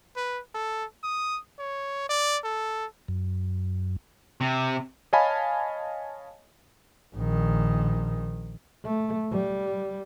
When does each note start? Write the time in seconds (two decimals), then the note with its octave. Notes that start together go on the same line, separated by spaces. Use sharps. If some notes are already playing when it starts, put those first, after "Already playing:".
0.16 B4
0.54 A4
1.03 D#6
1.59 C#5
2.09 D5
2.44 A4
3.08 F#2
4.41 C3
5.13 C#5 D#5 F5 G#5 A5 B5
7.15 A#1 D#3
8.83 A3
9.31 G3